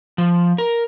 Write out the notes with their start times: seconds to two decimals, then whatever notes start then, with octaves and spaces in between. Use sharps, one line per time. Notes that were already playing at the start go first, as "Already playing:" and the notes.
0.18 F3
0.58 A#4